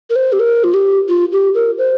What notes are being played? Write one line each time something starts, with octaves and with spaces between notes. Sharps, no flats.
A#4
C5
G4
A#4
F4
G4
F4
G4
A#4
C5